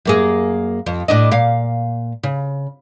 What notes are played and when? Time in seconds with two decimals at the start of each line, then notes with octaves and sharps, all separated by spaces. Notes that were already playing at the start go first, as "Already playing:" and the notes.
0.05 F#2 A#3 G#4
0.86 F2
1.08 A2 D4 D#5
1.31 A#2 F5
2.23 C#3